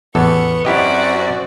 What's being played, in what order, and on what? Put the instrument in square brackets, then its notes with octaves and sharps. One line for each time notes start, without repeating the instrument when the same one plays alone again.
[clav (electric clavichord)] A1 E2 A4 [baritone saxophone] B3 [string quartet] C#6
[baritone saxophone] F#2 [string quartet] C4 F#4 D5 [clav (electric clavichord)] E4 G4 D#5